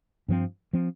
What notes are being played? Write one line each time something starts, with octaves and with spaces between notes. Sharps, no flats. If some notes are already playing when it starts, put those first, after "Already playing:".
G2 F3 C4
F3 C4